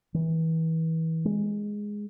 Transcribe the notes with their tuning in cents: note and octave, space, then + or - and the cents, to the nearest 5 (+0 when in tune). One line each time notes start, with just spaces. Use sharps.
E3 -30
G#3 -5